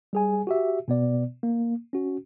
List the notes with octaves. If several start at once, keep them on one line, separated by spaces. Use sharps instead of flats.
G3 G#4 G#5
F#4 G4 E5
B2 B3 D5
A#3
C#4 F#4